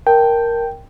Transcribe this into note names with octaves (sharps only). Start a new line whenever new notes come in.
A#4 G5 A5